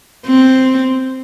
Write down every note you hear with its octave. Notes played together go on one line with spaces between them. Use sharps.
C4